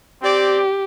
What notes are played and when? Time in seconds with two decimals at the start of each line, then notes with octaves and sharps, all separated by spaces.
0.23 C4 G4 D5